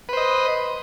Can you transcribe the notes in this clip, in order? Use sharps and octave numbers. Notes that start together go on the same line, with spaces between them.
B4 C5 D#5